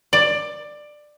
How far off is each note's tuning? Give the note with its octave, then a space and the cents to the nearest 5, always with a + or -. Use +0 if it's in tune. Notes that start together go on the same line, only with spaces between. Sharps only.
D5 +15